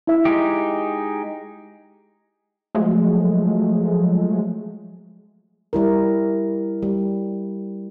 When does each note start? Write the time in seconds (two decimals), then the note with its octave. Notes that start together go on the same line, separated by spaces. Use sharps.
0.07 E4 E5
0.25 G#3 D#4 G4
2.75 F3 F#3 G#3 A3
5.73 G3 E4 A#4
6.82 G3